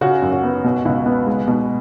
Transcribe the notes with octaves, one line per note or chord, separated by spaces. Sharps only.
C#3 F#4
F#2
F#4
B3
B2
C#2
B3
G#3
B2